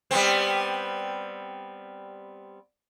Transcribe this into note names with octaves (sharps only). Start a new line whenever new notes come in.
G3 B3 C4